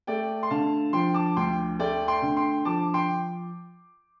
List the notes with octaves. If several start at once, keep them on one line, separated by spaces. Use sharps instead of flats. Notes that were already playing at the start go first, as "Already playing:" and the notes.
A3 D5 G5
C6
D3 F5 A5
F3 G5 C6
A5 D6
D2 G5 C6
A3 D5 G5
G5 C6
D3
G5 C6
F3 A5 D6
G5 C6